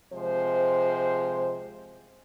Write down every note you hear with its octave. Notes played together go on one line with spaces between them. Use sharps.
C3 F3 G#3 C5